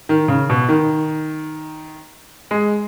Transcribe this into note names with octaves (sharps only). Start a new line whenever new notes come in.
D#3
C#3
B2
D#3
G#3